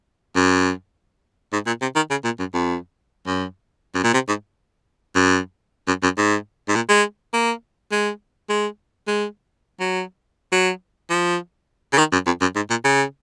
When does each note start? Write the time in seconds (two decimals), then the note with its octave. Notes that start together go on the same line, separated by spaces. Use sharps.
0.36 F#2
1.53 G#2
1.66 A#2
1.81 C3
1.95 D#3
2.10 C#3
2.24 A#2
2.39 F#2
2.54 F2
3.26 F#2
3.95 F#2
4.03 A#2
4.14 C3
4.28 G#2
5.15 F#2
5.87 F#2
6.03 F#2
6.17 G#2
6.68 G#2
6.75 A#2
6.89 G#3
7.33 A#3
7.92 G#3
8.49 G#3
9.07 G#3
9.80 F#3
10.52 F#3
11.10 F3
11.93 C#3
11.98 D#3
12.12 F#2
12.26 F2
12.41 F#2
12.55 G#2
12.70 A#2
12.84 C#3